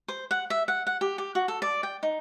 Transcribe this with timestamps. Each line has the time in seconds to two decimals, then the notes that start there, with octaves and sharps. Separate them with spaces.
0.08 C5
0.31 F#5
0.50 E5
0.68 F#5
0.87 F#5
1.01 G4
1.18 G4
1.35 F#4
1.48 A4
1.62 D5
1.83 G5
2.03 D#4